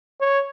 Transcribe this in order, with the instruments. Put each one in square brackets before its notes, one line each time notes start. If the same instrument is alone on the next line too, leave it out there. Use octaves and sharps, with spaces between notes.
[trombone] C#5